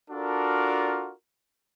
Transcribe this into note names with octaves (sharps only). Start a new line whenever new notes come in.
D4 F4 F#4 A4 A#4 D5